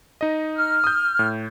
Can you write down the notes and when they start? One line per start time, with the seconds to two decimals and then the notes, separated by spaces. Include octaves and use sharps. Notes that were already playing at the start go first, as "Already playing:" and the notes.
0.21 D#4 D#5
0.57 F6
0.84 D#6 G6
1.19 A2